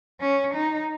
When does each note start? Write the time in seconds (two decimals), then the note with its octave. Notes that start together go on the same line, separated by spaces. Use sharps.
0.21 C#4
0.54 D#4